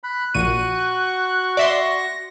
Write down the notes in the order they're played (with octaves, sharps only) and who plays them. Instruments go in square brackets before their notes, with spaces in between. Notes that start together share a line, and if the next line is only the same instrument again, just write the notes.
[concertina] B5 [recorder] F#6
[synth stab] A#1 A#2 D#7 [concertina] F#4 C#6 [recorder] F#6
[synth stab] D5 E5 C6 [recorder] A#6